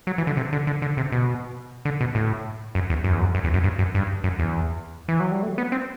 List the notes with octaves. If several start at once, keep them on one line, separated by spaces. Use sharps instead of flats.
F#3
E3
D3
C3
D3
D3
D3
C3
B2
D3
B2
A2
F#2
E2
F#2
E2
F#2
F#2
E2
F#2
G2
F#2
G2
F#2
E2
E3
F#3
G3
A3
B3
C4